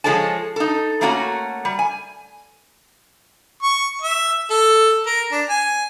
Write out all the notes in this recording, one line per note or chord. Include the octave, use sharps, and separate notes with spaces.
F3 G#3 A4 C#5 A5
D#4 A4
A3 A#3 C#4 D4 F#4 A#5
G3
G#5
C#6
E5
A4
A#4
D4
G#5